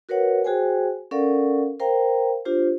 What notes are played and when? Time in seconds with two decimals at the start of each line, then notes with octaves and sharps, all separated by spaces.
0.09 F#4 A#4 B4 C#5 F#5
0.45 F#4 G#4 C5 G5 G#5
1.11 C#4 A4 A#4 D5 F5 F#5
1.80 A#4 C5 F5 G5 A#5
2.45 D4 F4 G4 C5